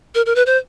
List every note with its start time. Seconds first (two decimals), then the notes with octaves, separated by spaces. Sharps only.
0.15 A#4
0.26 A#4
0.35 B4
0.46 C5